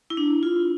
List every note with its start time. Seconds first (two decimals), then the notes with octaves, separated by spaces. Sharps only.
0.10 E4
0.17 D4
0.43 F4